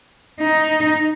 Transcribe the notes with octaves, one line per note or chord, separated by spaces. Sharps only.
D#4